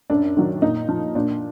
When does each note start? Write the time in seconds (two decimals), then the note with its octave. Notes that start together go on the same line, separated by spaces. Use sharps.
0.10 F#2 D4
0.37 D#3 F#3
0.62 A#2 D#4
0.89 F3
1.15 A#2 D4